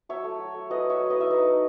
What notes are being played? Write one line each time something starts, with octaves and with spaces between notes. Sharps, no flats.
F#3 C#5 E5
A3
F#3
A3
F#3 B4 D#5
F#3 C#5 E5
F#3
E4 B4 D#5
E5
D#4 B4 D#5
D#4